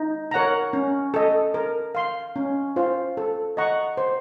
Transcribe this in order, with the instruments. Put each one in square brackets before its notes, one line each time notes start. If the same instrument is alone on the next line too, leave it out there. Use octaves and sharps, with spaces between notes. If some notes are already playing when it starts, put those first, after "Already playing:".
Already playing: [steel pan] D#4
A#4 C#5 F#5 A#5
C#4
A4 D#5
A#4
F5 C6
C#4
F4 C5 F5
A4
D#5 F#5 A#5 C#6
C5